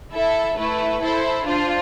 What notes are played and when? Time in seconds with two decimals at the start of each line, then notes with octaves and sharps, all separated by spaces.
0.12 E4 A4 E5
0.56 A3 E4 B4
1.00 E4 A4 C5
1.45 D4 F4 C5